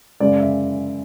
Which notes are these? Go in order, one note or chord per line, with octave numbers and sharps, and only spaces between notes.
F#2 C#3 G#3 D5
E5